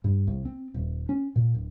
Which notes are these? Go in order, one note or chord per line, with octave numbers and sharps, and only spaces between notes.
G2
C2
C4
D#1
C#4
A#2
D1